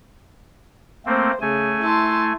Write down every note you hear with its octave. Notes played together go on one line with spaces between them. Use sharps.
A3 A#3 C4 C5
C#3 A3 G#5
E4 A5 C6